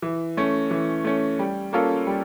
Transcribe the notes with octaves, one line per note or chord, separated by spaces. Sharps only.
E3
A3 C#4
E3
A3 C#4
G3
A#3 C#4 F4 A4
G3